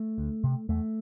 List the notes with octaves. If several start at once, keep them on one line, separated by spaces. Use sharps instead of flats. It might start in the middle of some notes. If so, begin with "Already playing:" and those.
Already playing: A3
D2
C3
E2 A3